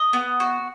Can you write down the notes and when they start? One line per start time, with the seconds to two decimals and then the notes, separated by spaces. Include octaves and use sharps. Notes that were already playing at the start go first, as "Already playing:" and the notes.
Already playing: D#5
0.13 B3
0.40 F#4